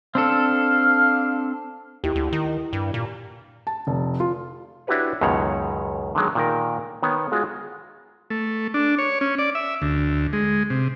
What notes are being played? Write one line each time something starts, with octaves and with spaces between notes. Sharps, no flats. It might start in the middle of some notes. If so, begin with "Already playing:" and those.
C4 D4 A4 F5
D#2 E4 G4
D2
D#3
G2
A#2
A5
F1
F4
D4 E4 F#4 G4 B4 C#5
C#2 F#2 B2 D#3 C#5 F#5
D3 D#3 F#3 G#3
A#2 D#3 A#4
D#3 B3 C#5
G#3 F4 F#4 G#4
A3
D4
C#5
C#4
D5
E5
D2
G#3
C3